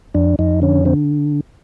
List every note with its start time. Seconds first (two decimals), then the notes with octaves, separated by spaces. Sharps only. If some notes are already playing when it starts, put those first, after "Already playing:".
0.14 F2 D4
0.39 F2 D#4
0.62 D3 C#4
0.85 D3 C4